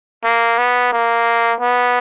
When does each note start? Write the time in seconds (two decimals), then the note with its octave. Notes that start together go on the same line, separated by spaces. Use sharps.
0.24 A#3
0.58 B3
0.93 A#3
1.60 B3